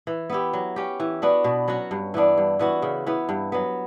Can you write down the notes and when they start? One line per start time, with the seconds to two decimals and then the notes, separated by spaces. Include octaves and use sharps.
0.07 E3
0.30 B3 E4 G4
0.53 F#3
0.76 C#4 G4
1.00 E3
1.22 B3 D4 F#4
1.44 B2
1.68 F#3 C#4 F#4
1.91 G2
2.14 E3 B3 D4
2.38 G2
2.59 E3 B3 F#4
2.82 C#3
3.07 E3 B3
3.29 G2
3.52 F#3 B3